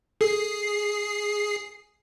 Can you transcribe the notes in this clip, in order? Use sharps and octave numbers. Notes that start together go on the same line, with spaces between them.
G#4 A4 C7